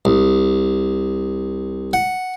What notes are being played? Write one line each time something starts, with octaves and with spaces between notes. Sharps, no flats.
C2
F#5